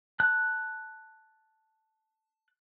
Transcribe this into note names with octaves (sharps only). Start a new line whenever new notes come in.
A5 F#6